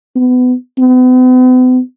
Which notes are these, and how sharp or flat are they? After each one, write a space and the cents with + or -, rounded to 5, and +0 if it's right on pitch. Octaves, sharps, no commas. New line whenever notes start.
B3 +25
B3 +45